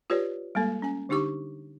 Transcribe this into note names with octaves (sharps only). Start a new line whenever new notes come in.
F4 G4 B4 C#5 D5
G3 G#3 A#3 A4
C#4 G#5
D3 D4 D#4 G4 C#6 D6